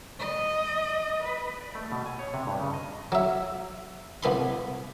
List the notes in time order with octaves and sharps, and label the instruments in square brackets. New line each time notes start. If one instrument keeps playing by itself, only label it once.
[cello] D#5
B4
[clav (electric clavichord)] D5
A3
B2
G#5
C#5
C3
G2
C#3
D#5
[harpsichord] F#3 E5
C2 B3 B5 C6